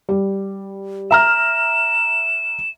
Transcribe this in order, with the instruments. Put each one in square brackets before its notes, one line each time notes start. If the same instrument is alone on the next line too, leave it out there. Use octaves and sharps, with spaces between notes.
[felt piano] G3
[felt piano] E5 A#5 F6 [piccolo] E7